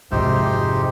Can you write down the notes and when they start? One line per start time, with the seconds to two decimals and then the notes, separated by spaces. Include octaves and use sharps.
0.11 G#1 F2 G#2 C3 D#4 G4 C5 E5
0.44 D6